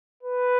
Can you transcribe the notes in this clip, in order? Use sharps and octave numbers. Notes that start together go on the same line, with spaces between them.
B4